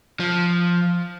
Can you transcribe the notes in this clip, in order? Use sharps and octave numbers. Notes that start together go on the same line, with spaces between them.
F3